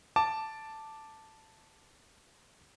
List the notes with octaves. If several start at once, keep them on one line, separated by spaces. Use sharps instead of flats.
A5 D6